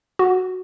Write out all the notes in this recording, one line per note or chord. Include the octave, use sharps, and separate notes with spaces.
F#4